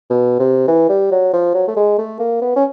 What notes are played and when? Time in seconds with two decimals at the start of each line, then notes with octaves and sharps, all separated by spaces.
0.10 B2
0.39 C3
0.68 E3
0.89 G3
1.11 F#3
1.33 F3
1.54 F#3
1.68 A3
1.76 G#3
1.99 A3
2.19 A#3
2.41 B3
2.56 C#4